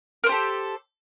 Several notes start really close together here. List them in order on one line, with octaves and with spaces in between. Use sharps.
A#4 C5 G4 A4